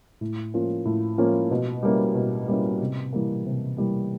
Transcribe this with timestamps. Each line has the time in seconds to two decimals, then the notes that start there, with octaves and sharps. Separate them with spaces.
0.21 A2
0.54 F3 A#3 C#4 F4
0.85 A2
1.18 F3 A#3 C#4 F4
1.51 B2
1.83 G3 A#3 C#4 E4
2.15 B2
2.48 G3 A#3 C#4 E4
2.81 C3
3.13 E3 G3 A#3
3.46 C3
3.77 E3 G3 A#3